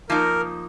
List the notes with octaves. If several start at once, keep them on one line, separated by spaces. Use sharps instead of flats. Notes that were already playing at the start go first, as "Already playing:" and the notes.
F3 A#3 D#4 A#4